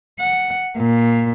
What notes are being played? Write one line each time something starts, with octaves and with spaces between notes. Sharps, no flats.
F#5
A#2